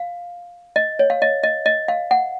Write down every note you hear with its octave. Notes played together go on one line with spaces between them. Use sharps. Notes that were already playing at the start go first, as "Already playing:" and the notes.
Already playing: F5
D#5
C#5
F5
D#5
D#5
D#5
F5
F#5